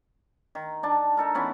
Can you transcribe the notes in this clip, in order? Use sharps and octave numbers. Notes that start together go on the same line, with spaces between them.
D#3
D4 A5
D#4 A4 A#4
E3 B3 C#4 B5